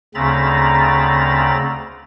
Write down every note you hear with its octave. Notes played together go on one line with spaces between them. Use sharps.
D2 C#3 C4 A#5 B5 A6